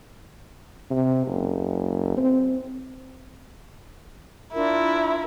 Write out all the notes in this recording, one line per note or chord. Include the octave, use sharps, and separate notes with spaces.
C3
F#1
C4
D4 E4 F4 A#4